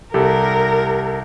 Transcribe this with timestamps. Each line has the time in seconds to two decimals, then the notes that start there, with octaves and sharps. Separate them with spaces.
0.14 C2 G4 A4 A#4